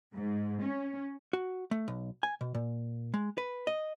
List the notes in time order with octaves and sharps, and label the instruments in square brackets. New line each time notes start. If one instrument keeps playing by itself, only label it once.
[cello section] G#2
C#4
[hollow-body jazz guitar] F#4
A3
B1
G#5
B2
A#2
G#3
B4
D#5